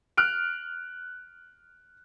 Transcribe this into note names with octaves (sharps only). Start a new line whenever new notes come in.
F6 F#6 D7